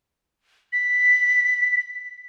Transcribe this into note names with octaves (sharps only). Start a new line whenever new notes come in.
B6